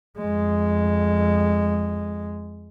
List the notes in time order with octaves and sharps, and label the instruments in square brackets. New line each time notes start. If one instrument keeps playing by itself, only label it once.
[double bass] F2 G#3